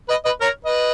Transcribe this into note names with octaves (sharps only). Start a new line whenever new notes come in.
B4 D#5
B4 D#5
A#4 C#5
B4 D#5